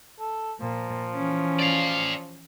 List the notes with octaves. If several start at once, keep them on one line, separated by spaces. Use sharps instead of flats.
A4
A#2 F3
E3 C#4
D5 F5